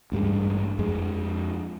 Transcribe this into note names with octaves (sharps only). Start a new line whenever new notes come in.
A1 G2 G3 G#3
F2 G#3